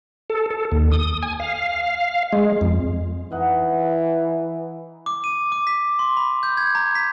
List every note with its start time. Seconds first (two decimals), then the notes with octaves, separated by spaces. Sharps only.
0.30 A4
0.50 A4
0.72 D#2
0.92 D#6
1.23 G#5
1.40 F5
2.33 G#3
2.61 F2
3.32 E3 D#4 F#5
5.06 D6
5.24 D#7
5.52 D6
5.67 B6
5.99 C6
6.17 B5
6.43 G6
6.57 G#6
6.75 A#5
6.95 B6